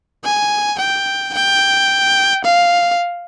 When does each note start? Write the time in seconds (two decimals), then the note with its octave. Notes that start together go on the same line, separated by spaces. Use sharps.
0.24 G#5
0.79 G5
1.34 G5
2.45 F5